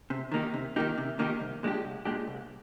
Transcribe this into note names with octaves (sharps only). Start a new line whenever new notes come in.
C3
D#3 A#3 D#4 G4
C3
D#3 A#3 D#4 G4
C3
D#3 A#3 D#4 G4
C2
A#2 G#3 D4 G4
C2
A#2 G#3 D4 G4
C2